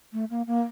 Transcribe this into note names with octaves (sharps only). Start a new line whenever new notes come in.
A3
A#3
A#3